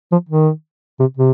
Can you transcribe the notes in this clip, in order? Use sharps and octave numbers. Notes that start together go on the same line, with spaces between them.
F3
D#3
C3
C3